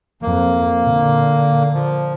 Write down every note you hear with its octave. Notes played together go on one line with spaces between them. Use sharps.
F2 A#3
A#2 D3
F3